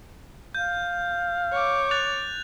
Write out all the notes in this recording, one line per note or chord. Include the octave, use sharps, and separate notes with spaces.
F5 G6
C#5 D6
F#6 A6 F7